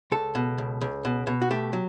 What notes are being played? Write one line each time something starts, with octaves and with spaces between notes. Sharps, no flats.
C#2 A4
B2
C#2
C#2
B2
B2
F#4
A3 G4
F#3